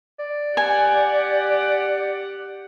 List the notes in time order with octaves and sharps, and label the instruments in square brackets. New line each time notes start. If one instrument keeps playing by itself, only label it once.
[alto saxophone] D5
[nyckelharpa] G4 F#5 [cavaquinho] G#5